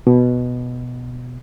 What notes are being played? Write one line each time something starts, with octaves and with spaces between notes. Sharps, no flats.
B2